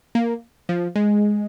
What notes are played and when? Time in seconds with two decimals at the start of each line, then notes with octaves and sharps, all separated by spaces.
0.15 A#3
0.69 F3
0.96 G#3